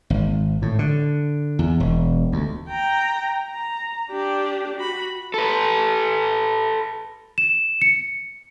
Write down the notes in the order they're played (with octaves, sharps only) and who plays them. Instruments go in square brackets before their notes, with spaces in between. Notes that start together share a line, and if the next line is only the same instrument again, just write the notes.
[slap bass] G#1
A2
D3
E2
E1
D2
[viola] G5 A#5
A#5
D4 G4
F#4 B5
[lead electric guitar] A4 B4
[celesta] E7
C#7